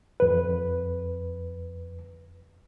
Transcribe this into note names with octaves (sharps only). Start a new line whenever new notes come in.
F2 B4